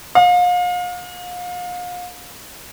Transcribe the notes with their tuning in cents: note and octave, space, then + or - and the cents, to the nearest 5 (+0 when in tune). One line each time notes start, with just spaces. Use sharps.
F5 +35